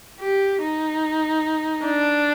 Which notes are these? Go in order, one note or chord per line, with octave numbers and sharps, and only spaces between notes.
G4
D#4
D4